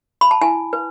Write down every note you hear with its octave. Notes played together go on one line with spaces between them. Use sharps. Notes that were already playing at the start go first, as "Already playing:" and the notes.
B5
A5
E4 G#5
B4